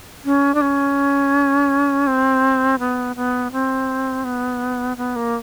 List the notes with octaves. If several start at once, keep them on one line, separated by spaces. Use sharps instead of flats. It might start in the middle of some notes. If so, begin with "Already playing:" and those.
C#4
D4
C#4
C4
B3
B3
C4
B3
B3
A#3